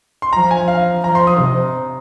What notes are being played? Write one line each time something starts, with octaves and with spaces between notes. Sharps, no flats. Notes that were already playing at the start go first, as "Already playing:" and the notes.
C6
F3 A#5
G#5
F5
F3 A#5
C6
D#6
C3